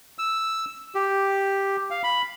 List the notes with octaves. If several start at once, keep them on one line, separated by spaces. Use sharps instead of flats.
E6
G4
F5
B5